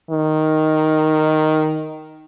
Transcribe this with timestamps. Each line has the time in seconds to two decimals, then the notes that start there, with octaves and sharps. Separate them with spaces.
0.11 D#3